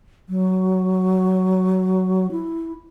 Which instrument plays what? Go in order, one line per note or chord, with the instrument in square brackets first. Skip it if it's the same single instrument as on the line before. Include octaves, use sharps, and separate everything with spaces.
[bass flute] F#3
E4